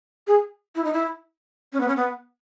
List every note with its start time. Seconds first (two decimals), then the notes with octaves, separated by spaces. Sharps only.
0.27 G#4
0.75 E4
0.84 D#4
0.93 E4
1.73 C#4
1.80 B3
1.88 C#4
1.96 B3